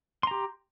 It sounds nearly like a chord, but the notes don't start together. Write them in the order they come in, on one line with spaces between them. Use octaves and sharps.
C6 A#5 G4